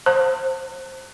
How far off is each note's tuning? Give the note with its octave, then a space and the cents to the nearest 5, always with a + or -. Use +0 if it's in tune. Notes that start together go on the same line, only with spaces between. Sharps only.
C5 +15 A5 +45